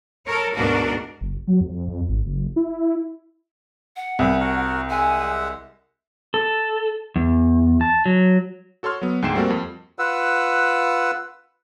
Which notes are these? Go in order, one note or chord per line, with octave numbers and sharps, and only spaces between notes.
A4 A#4 C#5
D2 G#2 B2 D4 F#4 A#4
F#1
F#3
F2
F2
G#1
F#1
E4
F#5
C2 B4
F#4 A#4
G#3 E5 F#5 G#5
A4
E2
A5
F#3
F#4 A4 C#5 C6 F6
F#3 B3
D2 G#2 G5 C7 E7
G3 A#3 C4 F#4 A4 A#4
F2
F4 B4 F#5 E6